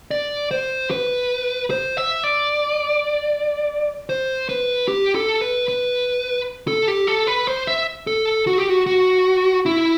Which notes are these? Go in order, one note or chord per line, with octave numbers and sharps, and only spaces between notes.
D5
C5
B4
C5
E5
D5
C5
B4
G4
A4
B4
B4
A4
G4
A4
B4
C5
E5
A4
F#4
G4
F#4
F#4
E4